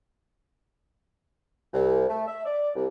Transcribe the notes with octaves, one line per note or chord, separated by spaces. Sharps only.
C2
A3
E5
D5
C2